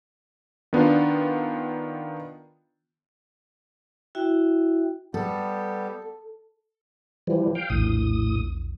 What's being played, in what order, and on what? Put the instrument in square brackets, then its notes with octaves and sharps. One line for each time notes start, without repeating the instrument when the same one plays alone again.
[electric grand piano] D#3 B3 D4 F4
[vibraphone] E4 F#4 E5 G5
[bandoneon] G3 B3 [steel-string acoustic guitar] A4
[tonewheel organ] E3 F3 G3
F5 G5
[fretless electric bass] A#1 E2 [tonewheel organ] A2 D#6